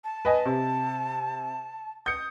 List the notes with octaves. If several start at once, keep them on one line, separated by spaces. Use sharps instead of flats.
A5
B4 D#5 G#5
C3
D#6 G6 C#7